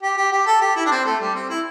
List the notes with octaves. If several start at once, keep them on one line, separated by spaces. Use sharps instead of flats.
G4
G4
G4
A4
G4
E4
D4
C4
A3
G3
C4
E4